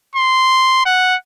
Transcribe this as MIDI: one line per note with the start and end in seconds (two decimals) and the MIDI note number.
0.15 0.85 84
0.86 1.16 78